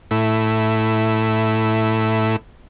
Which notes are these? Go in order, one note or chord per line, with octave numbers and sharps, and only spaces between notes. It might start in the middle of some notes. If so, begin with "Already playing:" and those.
A2 E4